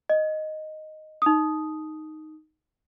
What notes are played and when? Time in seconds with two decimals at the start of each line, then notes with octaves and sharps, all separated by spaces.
0.09 D#5
1.22 D#4 D#6